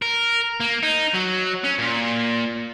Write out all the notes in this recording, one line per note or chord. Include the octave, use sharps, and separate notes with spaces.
A#4
A#3
D#4
F#3
C#4
A#2